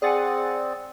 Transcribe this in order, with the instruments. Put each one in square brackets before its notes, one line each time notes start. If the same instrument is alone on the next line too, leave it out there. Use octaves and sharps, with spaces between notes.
[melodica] C4 [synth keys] G#4 F#5 G#5 [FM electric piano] D5 D#6 A6